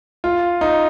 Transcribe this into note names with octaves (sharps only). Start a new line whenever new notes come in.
F4
D#4